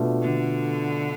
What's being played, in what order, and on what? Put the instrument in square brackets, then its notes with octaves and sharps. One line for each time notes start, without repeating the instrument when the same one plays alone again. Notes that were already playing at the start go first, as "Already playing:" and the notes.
Already playing: [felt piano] B2 A3 D4 F4
[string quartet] D3